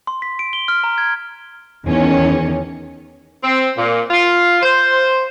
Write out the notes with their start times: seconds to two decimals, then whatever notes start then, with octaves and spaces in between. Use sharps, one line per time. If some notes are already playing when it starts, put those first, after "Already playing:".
0.07 C6
0.22 B6
0.39 D7
0.53 G7
0.68 F6
0.84 A#5
0.98 G#6
1.86 E2 D#3 C#4
3.44 C4
3.77 A#2
4.11 F4
4.62 C5